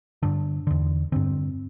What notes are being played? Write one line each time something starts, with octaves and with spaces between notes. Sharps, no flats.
G2 D3 D4
E2 D3
G2 D3 C4